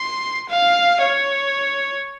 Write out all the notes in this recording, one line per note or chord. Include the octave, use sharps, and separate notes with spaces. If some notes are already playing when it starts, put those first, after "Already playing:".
Already playing: C6
F5
C#5